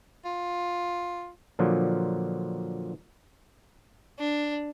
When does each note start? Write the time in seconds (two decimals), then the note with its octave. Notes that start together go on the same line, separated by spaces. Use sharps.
0.25 F4
1.59 A#2 D3 F3 F#3
4.19 D4